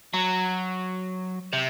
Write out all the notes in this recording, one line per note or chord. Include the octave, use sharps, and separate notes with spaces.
F#3
C3